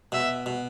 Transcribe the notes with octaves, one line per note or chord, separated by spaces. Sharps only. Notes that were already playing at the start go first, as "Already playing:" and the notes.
B2 E5
B2